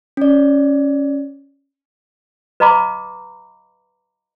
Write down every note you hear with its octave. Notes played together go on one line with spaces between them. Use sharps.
C#4 D5
B4 D#5 F5 A#5 B5 D6